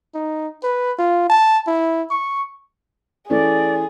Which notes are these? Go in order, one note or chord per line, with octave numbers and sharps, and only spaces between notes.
D#4
B4
F4
A5
E4
C#6
E3 A3 C#4 G#4 D5